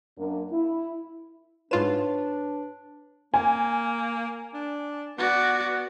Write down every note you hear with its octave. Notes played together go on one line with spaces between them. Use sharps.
F#2 A#3 D4
E4
G#2 D4 F4 B4 C#5 E7
A#3 G#5
D4
B3 F#4 D5